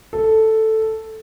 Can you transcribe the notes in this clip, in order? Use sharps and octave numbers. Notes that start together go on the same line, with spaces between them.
A4